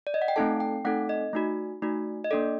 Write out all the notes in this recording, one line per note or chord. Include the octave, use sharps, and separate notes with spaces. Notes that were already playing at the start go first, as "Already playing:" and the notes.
D5
D#5
F#5
G5
A3 C4 D#4 A4 A5
G5
A3 C4 D#4 A4 F#5
D#5
A3 D#4 F#4
A3 D#4 F#4
D#5
A#3 D4 A4 D5